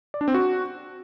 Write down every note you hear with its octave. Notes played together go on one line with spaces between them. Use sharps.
D5
D4
C4
F#4